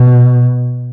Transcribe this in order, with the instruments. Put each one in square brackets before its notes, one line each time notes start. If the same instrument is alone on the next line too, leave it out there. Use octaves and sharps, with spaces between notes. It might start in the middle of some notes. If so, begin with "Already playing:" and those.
Already playing: [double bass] B2